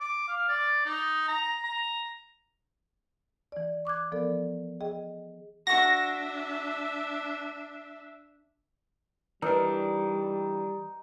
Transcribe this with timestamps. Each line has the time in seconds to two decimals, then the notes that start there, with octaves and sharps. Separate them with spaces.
0.01 D6
0.28 F5
0.49 D5
0.86 D#4
1.28 A#5
1.64 A#5
3.52 E3 D5
3.85 C#6 D6 F#6 G#6
4.12 F3 B3 A4 A#4 D5
4.81 G#4 D#5 G5
5.67 D4 F#4 E5 C#6 A#6
9.42 E3 G3 D4 D#4 A#4 B4